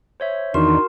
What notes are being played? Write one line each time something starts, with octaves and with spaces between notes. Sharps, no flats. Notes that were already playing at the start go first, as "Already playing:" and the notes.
C5 C#5 E5
E2 D#3 D4 D#4 F#4 A#4 C6